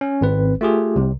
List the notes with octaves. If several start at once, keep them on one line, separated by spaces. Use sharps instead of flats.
C#4
G#1 C4 B4
A3 F4 G4 G#4
C2 C3